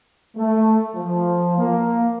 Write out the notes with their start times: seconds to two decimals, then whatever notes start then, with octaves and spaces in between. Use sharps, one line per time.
0.36 A3
0.95 F3
1.58 A#3